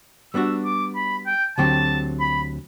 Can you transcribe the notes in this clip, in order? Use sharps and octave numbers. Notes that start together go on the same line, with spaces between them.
G3 B3 D4 F#4 E6
D6
B5
G5
D2 D3 F#3 C4 G4 A5
B5